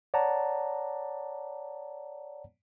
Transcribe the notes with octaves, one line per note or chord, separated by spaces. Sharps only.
C#5 D5 F#5 A5 A#5